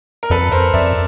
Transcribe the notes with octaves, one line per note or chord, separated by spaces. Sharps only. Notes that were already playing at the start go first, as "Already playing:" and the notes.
A#4
F2 A4 B4
A#4 C5
F2 D5 E5